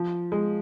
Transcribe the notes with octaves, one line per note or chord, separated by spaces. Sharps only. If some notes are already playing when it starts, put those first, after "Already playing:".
Already playing: F3
G#3